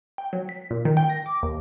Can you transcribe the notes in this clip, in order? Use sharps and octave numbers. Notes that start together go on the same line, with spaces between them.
G5
F#3
B6
A#2
D#3
G5
A#6
D6
D#2